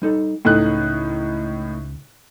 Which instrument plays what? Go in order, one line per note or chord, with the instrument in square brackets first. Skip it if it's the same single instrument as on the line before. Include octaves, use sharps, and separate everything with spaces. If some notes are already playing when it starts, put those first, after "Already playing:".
[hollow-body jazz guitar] G3 D#4 A4
[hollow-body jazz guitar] C#2 A4 G5 [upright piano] A2 D#4 F#6